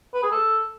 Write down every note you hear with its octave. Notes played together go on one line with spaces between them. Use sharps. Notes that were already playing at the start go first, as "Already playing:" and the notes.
B4
G#4
A4